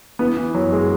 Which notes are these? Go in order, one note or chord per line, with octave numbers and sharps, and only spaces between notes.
E3 B3
E3
F#2 F#3
G#3